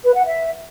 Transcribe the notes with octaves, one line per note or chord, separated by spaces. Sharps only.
B4
F#5
E5